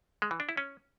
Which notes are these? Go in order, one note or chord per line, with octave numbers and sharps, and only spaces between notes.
G#3
E3
D4
E4
C#4